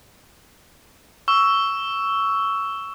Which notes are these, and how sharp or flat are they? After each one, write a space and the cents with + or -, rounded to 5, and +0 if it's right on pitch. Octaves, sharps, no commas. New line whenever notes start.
C#6 +15 E6 +0